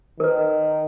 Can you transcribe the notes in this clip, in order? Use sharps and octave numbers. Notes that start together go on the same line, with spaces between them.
D#3 A#4 B4